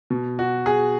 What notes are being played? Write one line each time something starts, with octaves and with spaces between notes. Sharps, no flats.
B2
F#4
G#4